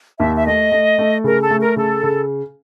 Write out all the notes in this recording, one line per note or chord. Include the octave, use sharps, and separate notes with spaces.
D#2 E5
E5
A3 D#5
A3
A3
C#3 A#4
A4
A3
A#4
C#3 A4
C#3